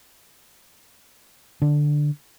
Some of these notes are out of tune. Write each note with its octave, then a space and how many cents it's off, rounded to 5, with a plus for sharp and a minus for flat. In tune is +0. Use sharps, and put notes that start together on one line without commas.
D3 +10 D4 +0